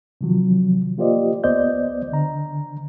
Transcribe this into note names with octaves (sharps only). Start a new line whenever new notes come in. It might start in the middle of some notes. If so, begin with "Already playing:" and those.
C3 D#3 F3 F#3
A#3 F4 G4 C5 D5 D#5
D2 B3 C5 D5 D#5 G6
D3 A#5